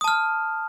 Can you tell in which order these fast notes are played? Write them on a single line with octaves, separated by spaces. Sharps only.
D#6 A5 F6